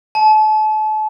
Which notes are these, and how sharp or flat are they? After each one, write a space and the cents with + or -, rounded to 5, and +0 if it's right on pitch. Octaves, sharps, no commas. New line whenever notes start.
A5 -35